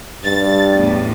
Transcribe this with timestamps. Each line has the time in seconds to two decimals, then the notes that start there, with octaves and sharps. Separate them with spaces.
0.24 G2 A6
0.75 E2 A2